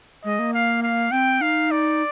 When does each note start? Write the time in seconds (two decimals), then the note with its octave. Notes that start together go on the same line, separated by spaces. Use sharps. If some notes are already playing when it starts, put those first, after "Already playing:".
0.25 G#3 D#5
0.39 A#3
0.54 F5
0.83 F5
1.12 C4 G5
1.41 D#4 F5
1.71 D5